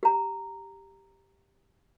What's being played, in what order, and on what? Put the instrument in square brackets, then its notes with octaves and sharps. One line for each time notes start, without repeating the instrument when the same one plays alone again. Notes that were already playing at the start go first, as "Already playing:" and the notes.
[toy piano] G4 A#5